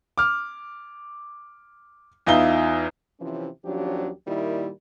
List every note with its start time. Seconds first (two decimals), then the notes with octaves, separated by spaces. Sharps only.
0.18 D6 F6
2.27 E2 D#4 F4 E5 G7
3.20 C3 E3 F3 C#4
3.65 D#2 F3 F#3 C#4 D4 G4
4.27 A#2 D#3 G3 A#3 E4